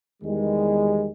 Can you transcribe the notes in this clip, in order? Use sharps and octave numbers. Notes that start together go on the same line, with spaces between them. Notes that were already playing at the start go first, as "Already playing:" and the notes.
E2 D#3 G3 G#3